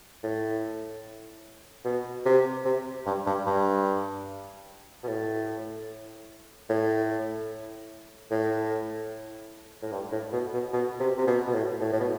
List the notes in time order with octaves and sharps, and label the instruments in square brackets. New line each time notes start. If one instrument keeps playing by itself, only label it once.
[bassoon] A2
B2
C3
C3
G2
G2
G2
B2
A2
A2
A2
A2
G2
A2
B2
B2
B2
C3
C3
B2
B2
A2
A2
A2
B2